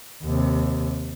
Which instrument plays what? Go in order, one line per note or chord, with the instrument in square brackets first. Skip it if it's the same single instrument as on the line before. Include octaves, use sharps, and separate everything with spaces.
[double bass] D#2 C3